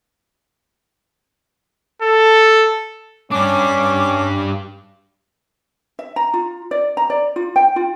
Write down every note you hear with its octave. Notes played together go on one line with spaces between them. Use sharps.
A4
G2 C#4 D4 D6
E5
A#5
F4
D5
A#5
D5
F4
G5
F4